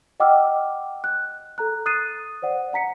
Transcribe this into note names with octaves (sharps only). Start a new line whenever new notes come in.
D#5 F#5 G5 D6 E6 F6
F#6
A4 A#5 F#6
D#6 F#6 A6 C7 D#7
C5 D5 F#5
F#5 A#5 B6 C#7